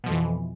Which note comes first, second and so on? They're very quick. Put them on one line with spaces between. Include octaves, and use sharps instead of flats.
B2 F3 F2 E3